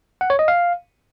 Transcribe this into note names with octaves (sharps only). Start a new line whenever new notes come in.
F#5
C#5
D#5
F5